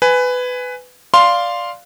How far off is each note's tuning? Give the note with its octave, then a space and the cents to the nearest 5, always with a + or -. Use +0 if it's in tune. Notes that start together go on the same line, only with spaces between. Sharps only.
B4 +15 G#5 +0
D5 +0 F5 +0 C6 +0